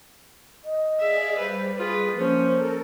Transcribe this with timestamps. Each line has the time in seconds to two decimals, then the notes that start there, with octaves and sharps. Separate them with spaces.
0.64 D#5
0.99 G#4 D5 E5 F5
1.38 G3 B4 C5
1.77 F4 G#4 B4
2.16 F3 A#3 C#4 C5
2.48 A4 A#4